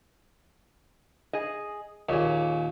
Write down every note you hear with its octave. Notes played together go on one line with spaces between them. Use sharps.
G#4 D#5
D#2 A#2 G#4 C#5